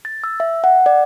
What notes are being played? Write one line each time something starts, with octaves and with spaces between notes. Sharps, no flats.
A6
E6
E5
F#5
D5